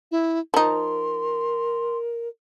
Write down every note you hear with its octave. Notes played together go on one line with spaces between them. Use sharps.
E4
F3 D#4 A#4 C6